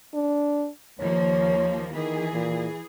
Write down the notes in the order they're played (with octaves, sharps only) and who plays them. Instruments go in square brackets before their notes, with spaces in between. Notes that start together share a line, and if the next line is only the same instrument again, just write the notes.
[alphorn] D4
[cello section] D#2 F3 A#3 [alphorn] C#5
[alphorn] D#3 [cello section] E3 G#4
[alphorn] A#2